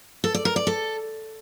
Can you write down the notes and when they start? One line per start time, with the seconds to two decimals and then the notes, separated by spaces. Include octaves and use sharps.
0.24 A4
0.34 D5
0.45 A#4
0.56 D5
0.67 A4